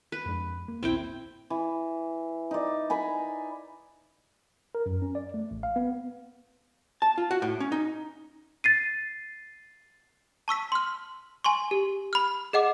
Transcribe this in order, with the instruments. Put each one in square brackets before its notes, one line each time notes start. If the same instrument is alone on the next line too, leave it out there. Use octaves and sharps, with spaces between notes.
[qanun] B4
[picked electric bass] F2 G#3 D4
A#3
[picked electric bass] A#1 D#2 [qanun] C4 E4 G5
[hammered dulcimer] E3
D#4 D5
G#5 A#5 B5
[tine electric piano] A#4
F#2
C#4
D5
A3
A1
F5
B3
[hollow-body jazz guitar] A5
F4
F#4
A2
C#4
D#4
[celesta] A6 C7 D#7
[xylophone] A5 C#6 E6 B6
C6 F6
G#5 C6 C#6
G4
B5 F6
G#4 D#5 F#5 D6